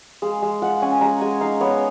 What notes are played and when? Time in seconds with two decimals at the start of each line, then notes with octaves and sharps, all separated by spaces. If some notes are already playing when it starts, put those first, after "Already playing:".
0.22 G#3 F5
0.42 G#3
0.62 F4 F#5
0.82 C#4 G#5
1.01 G#3 A#5
1.21 G#3 G#5
1.41 D#4 F5
1.61 B3 C#5